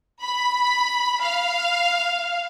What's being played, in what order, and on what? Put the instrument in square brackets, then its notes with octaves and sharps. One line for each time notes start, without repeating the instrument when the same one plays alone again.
[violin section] B5
F5